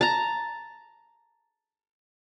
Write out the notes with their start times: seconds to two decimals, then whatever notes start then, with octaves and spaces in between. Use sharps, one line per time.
0.01 A5 A#5